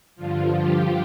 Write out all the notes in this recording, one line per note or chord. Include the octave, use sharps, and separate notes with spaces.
G2 D3 F3 F4
G4